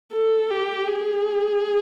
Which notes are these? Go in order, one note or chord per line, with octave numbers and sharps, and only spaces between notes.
A4
G4
G#4